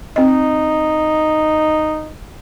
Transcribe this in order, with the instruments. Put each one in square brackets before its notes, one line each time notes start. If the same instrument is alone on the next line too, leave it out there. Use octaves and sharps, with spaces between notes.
[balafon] C4 D#5 [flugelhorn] D#4